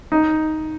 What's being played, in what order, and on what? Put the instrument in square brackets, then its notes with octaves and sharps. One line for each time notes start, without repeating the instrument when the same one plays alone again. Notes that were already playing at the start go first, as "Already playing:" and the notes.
[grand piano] D#4